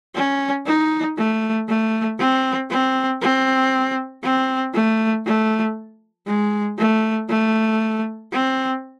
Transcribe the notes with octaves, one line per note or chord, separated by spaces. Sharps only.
C#4
D#4
A3
A3
C4
C4
C4
C4
A3
A3
G#3
A3
A3
C4